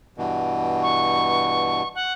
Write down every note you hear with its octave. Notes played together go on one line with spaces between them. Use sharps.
G2 B2 E3
C#6
F#5